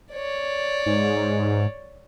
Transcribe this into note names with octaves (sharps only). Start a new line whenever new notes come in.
C#5 D5
G#2